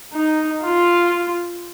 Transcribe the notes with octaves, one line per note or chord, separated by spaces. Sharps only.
D#4
F4